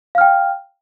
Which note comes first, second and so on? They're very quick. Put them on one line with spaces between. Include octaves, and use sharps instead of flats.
F5 F6 G5